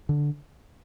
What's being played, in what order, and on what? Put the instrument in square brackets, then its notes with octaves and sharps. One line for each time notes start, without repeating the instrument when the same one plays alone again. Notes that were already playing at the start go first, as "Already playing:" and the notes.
[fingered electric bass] D3